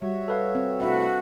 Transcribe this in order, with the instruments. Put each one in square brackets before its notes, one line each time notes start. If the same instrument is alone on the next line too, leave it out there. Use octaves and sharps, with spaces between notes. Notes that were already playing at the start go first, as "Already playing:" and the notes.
[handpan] G3 [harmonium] F#4 C#5 E5
[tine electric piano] A4 B4 F5
[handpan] C4
[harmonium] A2 C3 E4 [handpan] D4 E5 F#5 [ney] F#4